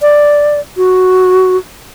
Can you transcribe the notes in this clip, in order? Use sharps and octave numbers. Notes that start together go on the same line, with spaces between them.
D5
F#4